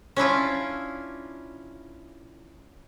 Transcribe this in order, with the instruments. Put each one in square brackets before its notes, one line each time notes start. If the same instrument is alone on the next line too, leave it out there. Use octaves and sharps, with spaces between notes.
[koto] C#4 D4 E4 F4